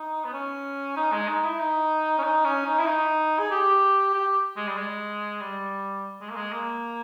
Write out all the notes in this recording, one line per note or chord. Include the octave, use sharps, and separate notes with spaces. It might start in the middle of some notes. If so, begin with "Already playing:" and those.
Already playing: D#4
B3
C#4
D#4
G#3
D#4
E4
D#4
C#4
D#4
C#4
D#4
E4
D#4
G#4
G4
G4
G#3
G3
G#3
G3
G#3
A#3
G#3
A#3